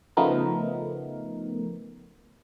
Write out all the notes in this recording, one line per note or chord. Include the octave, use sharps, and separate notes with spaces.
C#3 F3 A3 B3 D#4 A#4